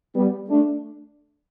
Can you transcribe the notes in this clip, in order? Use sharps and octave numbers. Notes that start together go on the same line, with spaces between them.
G3 B3
A3 D4